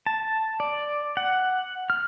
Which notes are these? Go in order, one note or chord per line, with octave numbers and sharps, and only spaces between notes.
A5
D5
F#5
F6